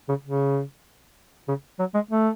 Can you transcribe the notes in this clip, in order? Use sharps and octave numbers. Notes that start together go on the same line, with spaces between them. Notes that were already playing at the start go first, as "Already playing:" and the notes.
C#3
C#3
C#3
F#3
G#3
A3